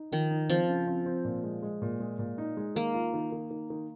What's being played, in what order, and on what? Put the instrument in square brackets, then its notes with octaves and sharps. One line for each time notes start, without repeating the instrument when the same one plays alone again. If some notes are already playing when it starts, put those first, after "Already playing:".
Already playing: [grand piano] D#4
[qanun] D#3 [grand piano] F3
[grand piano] D#4
[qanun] F3 [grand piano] C4
[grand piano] C#3
C4
C4
A#2
G#3
G#3
A#2
G#3
A#2
D#4
G#3
[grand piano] D#3 [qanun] A#3
[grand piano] F4
D#3
D#3
D#3
D#3